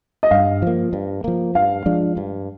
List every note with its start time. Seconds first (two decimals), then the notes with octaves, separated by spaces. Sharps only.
0.23 D#5
0.31 G2 F5
0.62 F3 A#3
0.93 G2
1.24 F3 A#3
1.55 G2 F5
1.86 F3 G#3 D4
2.17 G2